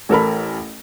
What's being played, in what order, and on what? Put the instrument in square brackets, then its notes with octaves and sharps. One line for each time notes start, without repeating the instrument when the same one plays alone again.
[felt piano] A1 A4 A#4 B5